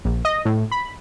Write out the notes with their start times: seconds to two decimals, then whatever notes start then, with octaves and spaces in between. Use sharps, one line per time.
0.05 A#1
0.25 D#5
0.45 A2
0.71 B5